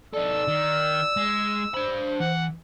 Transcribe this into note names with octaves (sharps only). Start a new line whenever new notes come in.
D#4 A4 D5 E6
D#3
G#3
D4 C5 B5
E3 F#5